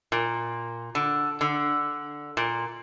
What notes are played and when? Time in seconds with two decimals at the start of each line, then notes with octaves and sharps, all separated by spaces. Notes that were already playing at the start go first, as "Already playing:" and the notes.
0.12 A#2
0.95 D3
1.41 D3
2.37 A#2